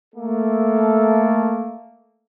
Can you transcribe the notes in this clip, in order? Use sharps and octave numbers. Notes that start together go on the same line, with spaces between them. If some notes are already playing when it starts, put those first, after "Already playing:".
A3 A#3 A4